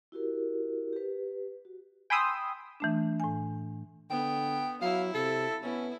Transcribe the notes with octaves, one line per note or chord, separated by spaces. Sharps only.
E4 F#4 G4 A#4
G4 B4
F#4
G5 G#5 B5 C6 D#6 E6
E3 A3 D4
A2 G#5
D3 B3 G5
F#3 E4 F5
C3 A4
B3 C#4 E4